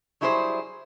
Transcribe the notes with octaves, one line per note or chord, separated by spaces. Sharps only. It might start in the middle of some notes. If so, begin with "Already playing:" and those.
F#3 G3 E4 G#4 B4 C5